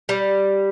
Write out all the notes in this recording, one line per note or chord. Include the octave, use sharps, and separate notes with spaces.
G3